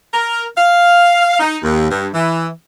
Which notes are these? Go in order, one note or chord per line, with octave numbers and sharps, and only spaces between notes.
A#4
F5
D#4
D#2
G2
E3